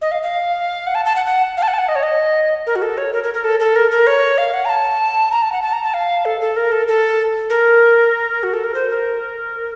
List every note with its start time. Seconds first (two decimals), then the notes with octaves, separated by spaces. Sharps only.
0.02 D#5
0.12 F5
0.22 F5
0.87 F#5
0.95 A5
1.05 A5
1.16 F#5
1.26 F#5
1.57 F5
1.63 A5
1.68 F#5
1.74 A5
1.78 F#5
1.89 D#5
1.96 C#5
2.03 D#5
2.67 A#4
2.76 F#4
2.82 A4
2.98 C#5
3.13 A#4
3.24 A#4
3.34 A#4
3.44 A4
3.60 A4
3.76 A#4
3.91 A#4
4.07 C#5
4.38 F5
4.54 F#5
4.65 A#5
4.69 A5
5.32 A#5
5.42 A5
5.52 F#5
5.62 A5
5.73 A#5
5.83 A5
5.94 F5
6.25 A4
6.41 A4
6.56 A#4
6.72 A4
6.88 A4
7.50 A#4
8.43 F#4
8.54 A4
8.64 A#4
8.74 C5
8.90 A#4